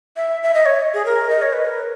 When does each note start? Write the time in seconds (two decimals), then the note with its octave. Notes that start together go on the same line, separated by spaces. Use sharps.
0.16 E5
0.43 E5
0.54 D#5
0.66 C#5
0.94 G#4
1.06 A#4
1.30 D#5
1.42 C#5
1.53 B4
1.65 A#4